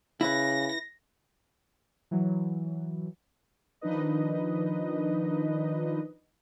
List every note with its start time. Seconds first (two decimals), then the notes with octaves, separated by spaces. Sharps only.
0.21 C#3 E4 B4 A#6
2.11 E3 F#3
3.81 D#3 F3 D4 D#4 B4 D#5